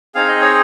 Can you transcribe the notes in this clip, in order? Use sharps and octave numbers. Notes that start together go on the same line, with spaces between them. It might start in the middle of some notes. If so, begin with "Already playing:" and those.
C4 D#4 G#4 F5
D#5
C#5